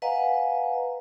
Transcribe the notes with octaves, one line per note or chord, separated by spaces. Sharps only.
B4 D#5 F5 F#5 G#5 A#5